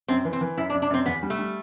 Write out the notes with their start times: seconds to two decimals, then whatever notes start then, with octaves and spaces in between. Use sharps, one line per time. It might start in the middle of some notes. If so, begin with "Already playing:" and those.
0.08 F#2 C4
0.25 E3
0.33 C4
0.41 E3
0.58 F#2 E4
0.70 D4
0.74 F#2
0.82 D4
0.91 F#2 C4
1.06 E2 B3
1.23 G3
1.30 A3
1.39 G3